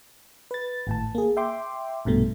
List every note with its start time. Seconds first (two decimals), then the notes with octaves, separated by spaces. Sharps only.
0.51 B4 A6
0.87 G#1 A2 A5
1.15 A#3 G#4
1.37 E5 G5 C6 D6
2.05 A#1 G2 B2 A3